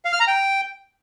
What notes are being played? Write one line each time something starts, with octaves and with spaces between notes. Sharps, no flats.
F5
F6
A#5
G5